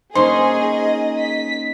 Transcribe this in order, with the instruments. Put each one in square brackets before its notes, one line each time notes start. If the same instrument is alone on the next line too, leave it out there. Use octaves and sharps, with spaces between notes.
[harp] A#3 C#4 D#4 [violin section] G#4 [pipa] C5 [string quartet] D#5
[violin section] B6